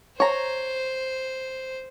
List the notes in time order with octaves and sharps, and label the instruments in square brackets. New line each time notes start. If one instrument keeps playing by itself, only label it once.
[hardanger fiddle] C5 [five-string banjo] C#5 A#5